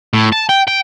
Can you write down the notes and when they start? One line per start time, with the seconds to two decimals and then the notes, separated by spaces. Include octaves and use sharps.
0.14 A2
0.32 A5
0.49 G5
0.68 G5